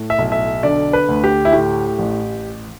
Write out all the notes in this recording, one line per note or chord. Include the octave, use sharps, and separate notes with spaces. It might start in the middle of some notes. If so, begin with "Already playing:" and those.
Already playing: A2
E5
B1
E5
D3 D5
B4
D2
G4
E4
A2 G4
A1